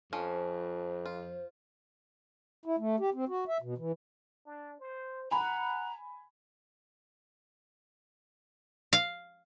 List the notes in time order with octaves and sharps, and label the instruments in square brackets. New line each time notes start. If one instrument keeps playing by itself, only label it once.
[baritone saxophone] F2 [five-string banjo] F3 C#4 [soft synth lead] C5
[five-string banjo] F4
[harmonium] E4
A3
G4
C4
F#4
E5
B2
E3
[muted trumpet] D4
C5
[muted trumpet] F#5 [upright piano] G#5 B5 [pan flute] A#5
[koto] F5